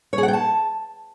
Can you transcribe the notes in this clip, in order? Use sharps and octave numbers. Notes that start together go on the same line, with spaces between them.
C#5
G#4
F#5
G5
A5